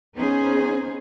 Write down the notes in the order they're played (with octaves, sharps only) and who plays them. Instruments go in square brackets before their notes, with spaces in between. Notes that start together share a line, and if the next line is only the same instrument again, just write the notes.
[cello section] B3 C#4 D#4 G#4 C5